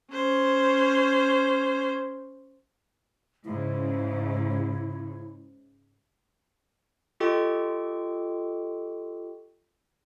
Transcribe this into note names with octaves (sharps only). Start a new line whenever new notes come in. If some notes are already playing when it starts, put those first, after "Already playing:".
C#4 C5
G#2 C#3 E4
F4 G4 A4 D#5 G5 C#6